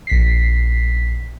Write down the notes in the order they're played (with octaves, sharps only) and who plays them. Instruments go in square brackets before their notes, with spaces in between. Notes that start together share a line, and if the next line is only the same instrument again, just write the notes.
[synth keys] A#1 B6 C7